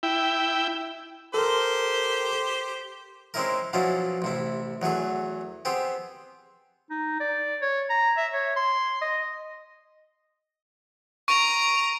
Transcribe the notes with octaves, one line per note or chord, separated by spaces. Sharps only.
E4 G5
G4 A4 A#4 C5
G#3 C4 C#4 D#4 E4 A#4
B2 F3 F#3 C#4 D4 E4
A1 C3 E4
E2 F#3 A3 G#4
B3 C4 G4 G#4
D#4
D5
C#5
A#5
E5
C#5
C6
D#5
A#5 C#6 D7